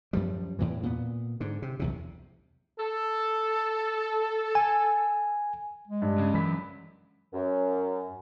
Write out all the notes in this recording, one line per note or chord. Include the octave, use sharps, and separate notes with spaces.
F#2 F3 G3
E2 A2 E3
A#2 B3
G#2 D3
C3
B1 E2 C3
A4
G#5
G#3
G2
C#3
F#2 E3 B5 B6
F#2